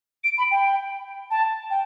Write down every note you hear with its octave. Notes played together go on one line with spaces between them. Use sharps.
D7
B5
G5
A5
G5